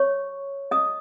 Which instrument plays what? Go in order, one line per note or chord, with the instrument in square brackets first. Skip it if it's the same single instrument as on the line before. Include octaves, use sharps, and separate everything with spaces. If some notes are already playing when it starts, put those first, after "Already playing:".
Already playing: [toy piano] C#5 C#6
D#5 D#6